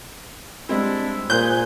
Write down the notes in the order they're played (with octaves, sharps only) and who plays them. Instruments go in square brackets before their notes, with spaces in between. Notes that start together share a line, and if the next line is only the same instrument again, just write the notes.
[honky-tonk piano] G3 G#3 C4 [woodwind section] D4 E4
[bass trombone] A#2 [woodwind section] G#4 G#5 [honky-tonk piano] C5 F#6 [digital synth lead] G6